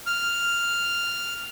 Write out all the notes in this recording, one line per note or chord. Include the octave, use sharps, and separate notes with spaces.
F6